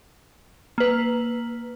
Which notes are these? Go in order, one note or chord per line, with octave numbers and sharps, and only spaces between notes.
A#3 B4